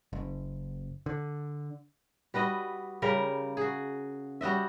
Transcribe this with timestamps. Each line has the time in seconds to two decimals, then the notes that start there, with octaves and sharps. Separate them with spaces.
0.13 F#1
1.06 D3
2.34 G3 F#4 B4 D#5
3.02 C#3 G3 A#4
3.57 F#4 G#4
4.41 G3 F#4 D#5 E5